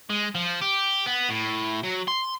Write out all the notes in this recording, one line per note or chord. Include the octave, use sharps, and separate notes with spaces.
G#3
F3
G4
B3
A2
F#3
C6